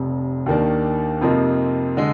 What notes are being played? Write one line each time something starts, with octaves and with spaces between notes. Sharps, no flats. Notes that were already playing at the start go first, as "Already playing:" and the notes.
Already playing: F1 F2 C3
D#2 D#3 A#3 D4
F2 C3 F3 A#3 D#4
D3 G#3